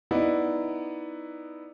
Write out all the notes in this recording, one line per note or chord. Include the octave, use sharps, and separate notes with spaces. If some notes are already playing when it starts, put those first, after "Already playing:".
B3 D#4 E4 D5